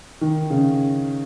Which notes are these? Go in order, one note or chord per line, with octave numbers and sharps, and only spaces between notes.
D#3
C#3